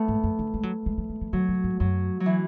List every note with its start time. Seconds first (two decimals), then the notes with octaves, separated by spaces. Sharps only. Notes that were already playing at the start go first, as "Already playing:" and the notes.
Already playing: A3 B3
0.08 G#2
0.24 F#2
0.39 D3
0.54 G#3
0.63 F#3
0.86 G#3
0.98 F#3
1.10 G#3
1.22 F#3
1.33 D3 F#3
1.49 C#3
1.64 G#2
1.80 F#2 F#3
2.20 F#3
2.26 E3